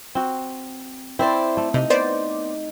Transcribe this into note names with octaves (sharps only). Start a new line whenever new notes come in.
C4 F#4
C4 E4 C5 D5
A3
C3 D#4
B3 C5 D5